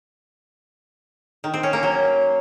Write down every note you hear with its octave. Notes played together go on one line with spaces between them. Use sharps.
D#3
C4
C#4
A#3
F#3